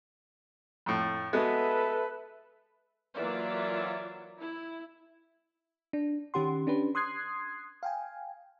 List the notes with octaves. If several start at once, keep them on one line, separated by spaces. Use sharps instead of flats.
F2 A2
G#3 B3 F#4 A4 B4 E5
E3 F#3 A#3 F4 D5 E5
E4
D4
D#3 C#4 G4 F#5 C6
C#4 D4 G4 B4
C6 D#6 F#6 G#6 C7
F5 G5 G#5